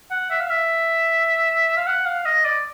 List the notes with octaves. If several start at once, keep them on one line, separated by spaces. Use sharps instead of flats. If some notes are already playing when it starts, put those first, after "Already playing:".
F#5
E5
F5
E5
F5
F#5
F5
D#5
D5